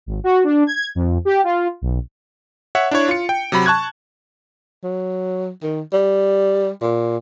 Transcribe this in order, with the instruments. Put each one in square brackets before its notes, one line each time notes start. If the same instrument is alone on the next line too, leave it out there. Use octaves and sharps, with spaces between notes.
[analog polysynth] G#1
F#4
D4
G#6
F2
G4
F4
B1
[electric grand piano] C#5 E5 F#5
D4 E4 C#5
F4 C#7
G5
C3 F#3 B5
A5 C#6 F#6 G#6
[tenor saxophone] F#3
D#3
G3
A#2